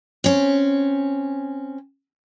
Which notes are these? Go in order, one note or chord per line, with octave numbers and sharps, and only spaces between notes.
C4 C#4